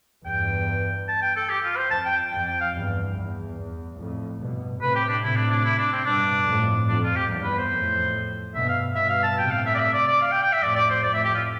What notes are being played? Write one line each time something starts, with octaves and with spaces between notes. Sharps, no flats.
E2 G2 G5
A5
G5
A4
G4
F4
C5
F2 A5
G5
F2 G5
G5
F5
E2 G2
E2
E2
F2 A2
G2 B2
A2 C3 B4
G4
D4
A2 C3 E4
D4
D4
E4
D4
C4
G2 B2 D4
F2 A2
F2 D4
F4
G4
E2 G2
B4
C5
F2 A2
G2 B2 E5
F5
G2 B2 E5
F5
A5
A2 C3 G5
F5
E5
D5
E5
D5
D5
F5
G5
G5
E5
F2 A2 D5
D5
C5
F2 A2 D5
E5
G4
F4